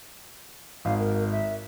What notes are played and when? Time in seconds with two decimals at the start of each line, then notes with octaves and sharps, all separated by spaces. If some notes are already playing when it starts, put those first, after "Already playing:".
0.85 G#1 F5
1.00 A#4
1.31 E5